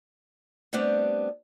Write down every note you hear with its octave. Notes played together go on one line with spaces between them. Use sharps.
G3 A3 B3 C4 D4 G4